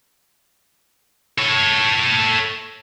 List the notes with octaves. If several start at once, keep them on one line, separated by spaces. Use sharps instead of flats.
A4 C#5